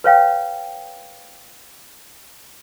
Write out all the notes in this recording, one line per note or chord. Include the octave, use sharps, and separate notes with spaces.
B4 C#5 F5 G5